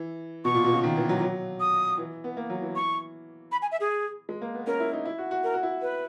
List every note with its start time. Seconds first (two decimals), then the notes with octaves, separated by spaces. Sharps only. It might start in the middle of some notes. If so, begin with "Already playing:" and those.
Already playing: E3
0.45 B2 C#6
0.55 A#2
0.64 B2
0.73 C#3
0.83 D#3
0.96 E3
1.09 F#3
1.22 F#3
1.60 D#6
1.98 E3
2.24 B3
2.37 A#3
2.50 F#3
2.62 E3
2.76 C#6
3.52 B5
3.62 G#5
3.72 E5
3.80 G#4
4.29 G#3
4.42 A#3
4.54 B3
4.67 C#4 A#4
4.80 E4
4.93 D#4
5.05 E4
5.18 F#4
5.31 F#4
5.44 A#4
5.54 F#4
5.63 E4
5.82 B4